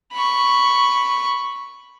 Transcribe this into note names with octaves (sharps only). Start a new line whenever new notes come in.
B5 C#6